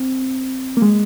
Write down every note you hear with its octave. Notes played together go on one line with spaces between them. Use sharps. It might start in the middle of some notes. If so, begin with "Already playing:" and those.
Already playing: C4
A#3
G#3